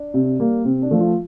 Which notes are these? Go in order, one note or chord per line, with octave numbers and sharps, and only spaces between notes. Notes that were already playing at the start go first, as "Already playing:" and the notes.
Already playing: D4
C3
G3 A#3
C3 C4
D4
F3 A3
F4